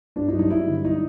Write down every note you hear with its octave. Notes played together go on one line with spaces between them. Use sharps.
G2 D4
D#4
F#3
D#4
G2 E4
D3
D#4